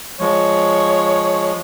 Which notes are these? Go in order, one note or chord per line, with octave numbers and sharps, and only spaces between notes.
F3 G#3 C#5